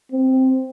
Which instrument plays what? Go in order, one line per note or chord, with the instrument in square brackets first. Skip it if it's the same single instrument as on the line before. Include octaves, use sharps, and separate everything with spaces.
[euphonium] C4